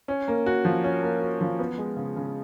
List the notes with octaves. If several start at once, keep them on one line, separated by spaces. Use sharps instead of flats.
C#4
A#3
F#4
F3
C#4
A#3
F#4
F3
B3
G#3
C#3
C#3